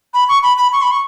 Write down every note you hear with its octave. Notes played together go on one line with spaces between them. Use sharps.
B5
C#6
B5
B5
C#6
B5
C#6